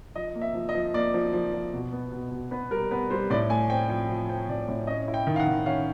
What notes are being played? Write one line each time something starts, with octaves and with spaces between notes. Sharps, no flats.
F3 D#5
A#3
E5
F3
D#5
F3
A#3 D5
F3
F3
F3
B2
B3
B2
B2
B3 B4
G3 A#4
B3 B4
G3 C5
A2 D5
A3 G#5
C4 G5
F3 G5
F3
C4 G5
A2 D5
A2
C#4 D#5
E4
G5
D#3
F5
F#5
D#3
C#4 F5